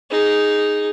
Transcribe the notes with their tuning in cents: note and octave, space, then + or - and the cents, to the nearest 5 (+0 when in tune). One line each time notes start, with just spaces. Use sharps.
D#4 +0 G#4 +0